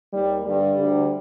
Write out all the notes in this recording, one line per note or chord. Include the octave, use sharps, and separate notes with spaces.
D#2 D#3 G3
G2 D3 G3
D2 D3